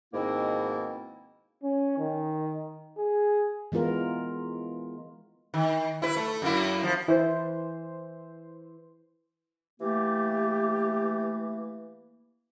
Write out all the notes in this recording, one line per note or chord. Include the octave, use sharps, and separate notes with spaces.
G#2 B2 D#3 A#3 C4 E4
C#4
D#3
G#4
E3 G#3 B3 F4 A#4
D#3
E4 B4
A3
F#2 A#3 E4
F3
E3 C5
E3 A3 A#3 G4